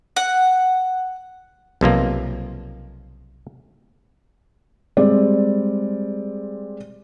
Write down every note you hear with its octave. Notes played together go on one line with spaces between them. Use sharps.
F#5
B1 C3 F3 A#3
G3 G#3 C4 D5